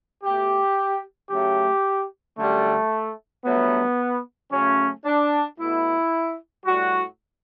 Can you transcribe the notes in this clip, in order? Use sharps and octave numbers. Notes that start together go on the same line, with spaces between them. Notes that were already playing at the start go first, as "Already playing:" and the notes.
B2 A3 G4
C#3 F#3 A3 G4
F#2 D3 G3 A3
G2 F#3 A3 B3
C#3 F#3 A3 C#4
D4
B2 A3 E4
A2 G3 F#4